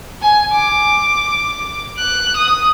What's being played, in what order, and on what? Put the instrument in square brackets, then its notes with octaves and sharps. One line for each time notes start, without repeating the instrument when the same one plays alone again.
[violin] G#5
D6
F#6
D#6